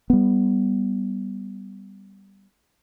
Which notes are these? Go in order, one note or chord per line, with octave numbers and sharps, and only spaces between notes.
G3 B3